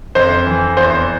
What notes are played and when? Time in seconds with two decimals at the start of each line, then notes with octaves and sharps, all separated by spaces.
0.15 F2 C5
0.46 E3
0.77 E2 C5